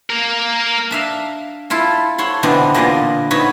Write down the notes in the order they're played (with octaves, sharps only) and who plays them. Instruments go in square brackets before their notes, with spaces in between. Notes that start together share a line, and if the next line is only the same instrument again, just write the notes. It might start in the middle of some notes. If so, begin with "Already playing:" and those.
[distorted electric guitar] A#3 A#4
[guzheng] D4 E5 F5
E4 F4 A4
A4 C#5 F#5 C6
B2 D3 E3 B3 C4 D4
A#2 D3 B3 F4 D5 D#5
B3 D#4 B4 C#5 E5